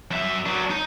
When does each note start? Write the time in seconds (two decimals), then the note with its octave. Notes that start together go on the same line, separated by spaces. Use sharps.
0.11 F#2 E5
0.46 F#3 D4
0.70 D#4